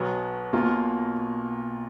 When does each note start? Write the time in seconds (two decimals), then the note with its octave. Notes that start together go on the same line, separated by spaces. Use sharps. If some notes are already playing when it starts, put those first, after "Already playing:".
Already playing: B1 B2 F#3 B3
0.53 B1 B2 A#3 F4